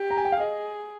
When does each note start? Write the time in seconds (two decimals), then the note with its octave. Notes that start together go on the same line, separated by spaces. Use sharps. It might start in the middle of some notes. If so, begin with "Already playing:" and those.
Already playing: G4
0.10 A#5
0.17 G#5
0.25 G5
0.32 F5
0.40 G#4 D#5